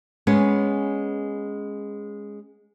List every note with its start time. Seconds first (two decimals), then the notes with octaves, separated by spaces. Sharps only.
0.27 G#3 B3 C#4